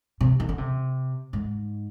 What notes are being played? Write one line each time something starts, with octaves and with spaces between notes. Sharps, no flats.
C3
D#3
D3
C3
G#2